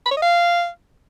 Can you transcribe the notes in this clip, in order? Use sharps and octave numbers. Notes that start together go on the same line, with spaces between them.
B5
C#5
D#5
F5